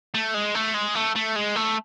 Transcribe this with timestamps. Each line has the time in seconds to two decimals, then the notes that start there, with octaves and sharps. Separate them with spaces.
0.14 A3
0.34 G#3
0.55 A3
0.74 G#3
0.95 A3
1.15 A3
1.36 G#3
1.56 A3